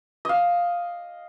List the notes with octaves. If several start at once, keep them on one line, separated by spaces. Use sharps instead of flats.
D#5 F5